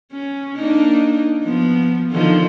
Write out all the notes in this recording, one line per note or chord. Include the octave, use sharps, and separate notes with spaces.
C#4
A#3 D4 D#4
F3 B3
D3 D#3 F3